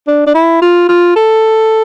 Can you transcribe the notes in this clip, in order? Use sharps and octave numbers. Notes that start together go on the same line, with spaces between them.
D4
D4
E4
F4
F4
A4